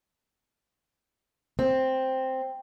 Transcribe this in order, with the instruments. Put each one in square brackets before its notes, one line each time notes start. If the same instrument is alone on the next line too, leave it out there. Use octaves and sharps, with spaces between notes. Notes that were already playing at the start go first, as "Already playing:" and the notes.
[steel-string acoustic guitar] C4